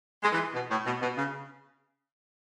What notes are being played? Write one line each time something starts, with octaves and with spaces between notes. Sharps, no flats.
G#3
E3
B2
A2
B2
B2
C#3